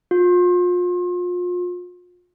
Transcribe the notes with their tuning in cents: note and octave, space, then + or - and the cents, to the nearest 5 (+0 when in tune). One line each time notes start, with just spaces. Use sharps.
F4 +35